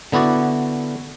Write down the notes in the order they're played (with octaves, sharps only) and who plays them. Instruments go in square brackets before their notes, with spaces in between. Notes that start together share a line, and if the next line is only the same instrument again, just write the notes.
[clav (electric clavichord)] D3 B3 E4 F#4 D5